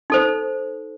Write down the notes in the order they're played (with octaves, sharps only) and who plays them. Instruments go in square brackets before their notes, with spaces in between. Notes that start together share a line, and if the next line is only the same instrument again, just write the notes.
[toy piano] D#4 A4 C5